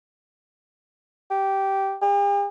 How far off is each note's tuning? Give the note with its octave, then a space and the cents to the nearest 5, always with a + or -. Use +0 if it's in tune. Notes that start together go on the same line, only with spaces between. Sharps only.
G4 -10
G4 +45